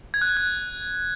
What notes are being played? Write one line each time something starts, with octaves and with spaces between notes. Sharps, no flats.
G#6
F#6
G#6
F#6